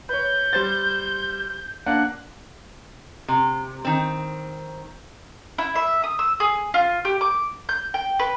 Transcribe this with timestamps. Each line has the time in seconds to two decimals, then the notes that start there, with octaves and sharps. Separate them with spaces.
0.09 B4 C#5 G6
0.53 G3 C5 A6
1.86 A#3 D4 F#5 F#6
3.28 C3
3.85 D#3 C4
5.58 E4
5.75 E5
6.04 D#6
6.19 E6
6.40 G#4
6.74 F4
7.05 G4
7.21 D6
7.69 G6
7.94 G5
8.19 B4